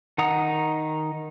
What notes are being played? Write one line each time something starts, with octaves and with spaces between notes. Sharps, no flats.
D#3 D#4 F#5 A#5 D#6